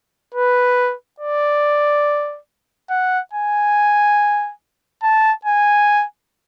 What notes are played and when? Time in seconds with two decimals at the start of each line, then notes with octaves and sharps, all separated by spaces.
0.35 B4
1.20 D5
2.90 F#5
3.33 G#5
5.03 A5
5.45 G#5